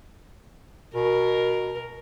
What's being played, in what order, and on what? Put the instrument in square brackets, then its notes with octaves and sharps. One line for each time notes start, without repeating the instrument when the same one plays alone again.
[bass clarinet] B2 [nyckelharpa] A#4